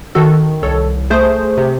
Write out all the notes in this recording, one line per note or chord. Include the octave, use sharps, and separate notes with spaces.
D#3 F#4 A4
C2 A4 C#5
A3 G#4 C5
C3